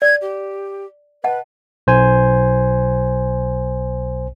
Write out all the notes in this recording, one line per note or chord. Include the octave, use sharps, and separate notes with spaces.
D5 G#6
G4
B4 D#5 F#5 A5
B1 C5 G#5